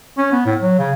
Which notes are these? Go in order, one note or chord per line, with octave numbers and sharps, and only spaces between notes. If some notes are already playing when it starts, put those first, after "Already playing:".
C#4
B3
A2
F#3
C#3